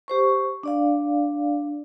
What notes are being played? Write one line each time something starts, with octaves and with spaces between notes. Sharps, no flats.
G4 C5 C#6
D4 D5 F5